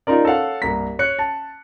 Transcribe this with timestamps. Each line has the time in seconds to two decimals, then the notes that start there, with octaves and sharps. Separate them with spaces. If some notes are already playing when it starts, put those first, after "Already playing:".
0.07 D#4 F4 A#4 D5
0.25 A4 C#5 F5 F#5
0.62 C2 G2 A#3 A#5 B6
0.99 C#5 F#6 C#7
1.19 A5